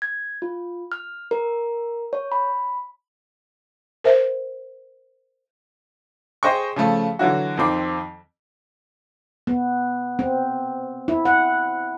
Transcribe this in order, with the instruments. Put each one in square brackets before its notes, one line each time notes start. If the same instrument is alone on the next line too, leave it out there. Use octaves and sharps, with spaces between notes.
[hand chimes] G#6
F4
F6
A#4
C#5
B5
[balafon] A#4 C5 E5
[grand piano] G#4 C5 D#5 G5 C#6
C#3 F3 A3
D3 E3 F#3 E4 F#4
F2 D#3 C4 D6
[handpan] B3
C4
E4
F#5